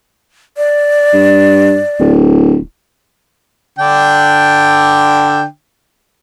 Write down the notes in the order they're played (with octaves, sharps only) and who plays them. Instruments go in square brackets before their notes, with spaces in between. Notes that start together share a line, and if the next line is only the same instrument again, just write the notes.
[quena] D5
[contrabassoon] G2
D1
[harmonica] D3 D4 G5